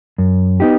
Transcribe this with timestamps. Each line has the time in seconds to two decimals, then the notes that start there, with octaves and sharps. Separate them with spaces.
0.18 F#2
0.60 B3 D#4 G4